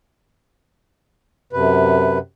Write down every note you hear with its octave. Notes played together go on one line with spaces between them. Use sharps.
F#2 C3 B4